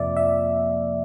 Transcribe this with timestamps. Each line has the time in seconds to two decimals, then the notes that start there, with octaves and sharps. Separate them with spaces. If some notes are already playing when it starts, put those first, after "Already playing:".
Already playing: F2 C3 F3 A#3 D5 E5
0.16 E5